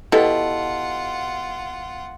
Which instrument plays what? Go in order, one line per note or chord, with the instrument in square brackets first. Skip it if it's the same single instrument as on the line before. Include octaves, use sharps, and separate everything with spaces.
[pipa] B2 [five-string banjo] E4 G4 [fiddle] F4 F#5 [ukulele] A4